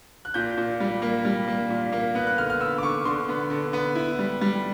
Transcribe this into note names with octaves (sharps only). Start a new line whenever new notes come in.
F#6
A#2 G6
A#2
G3
A#3
G3
A#3
A#2
A#3
B3 F#6
F#6
D3 F6
F6
B3 E6
D6
D3 C#6
D3 C6
B3
D3
B3
E4
G3
G3